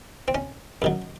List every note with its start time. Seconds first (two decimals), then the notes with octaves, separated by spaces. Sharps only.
0.28 C4
0.35 C#4
0.82 F#2 D#3 F#3